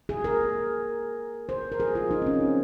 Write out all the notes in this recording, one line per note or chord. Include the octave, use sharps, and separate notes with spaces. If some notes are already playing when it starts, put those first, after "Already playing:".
G#4
A#4
C5
A#4
G#4
F4
D#4
C4
C#4